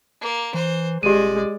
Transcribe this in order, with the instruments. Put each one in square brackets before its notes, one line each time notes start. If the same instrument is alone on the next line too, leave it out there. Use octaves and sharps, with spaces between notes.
[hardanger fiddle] A#3
[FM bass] E3 [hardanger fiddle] C5
[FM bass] D#1 [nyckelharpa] G#3 [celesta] G4 D#7 [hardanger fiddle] D5